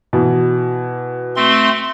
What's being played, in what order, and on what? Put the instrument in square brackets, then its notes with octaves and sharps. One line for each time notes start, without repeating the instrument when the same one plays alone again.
[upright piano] B2 E3
[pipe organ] A3 C4 C6